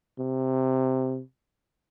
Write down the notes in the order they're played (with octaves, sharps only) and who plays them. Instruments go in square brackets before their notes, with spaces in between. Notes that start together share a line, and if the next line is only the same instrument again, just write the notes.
[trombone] C3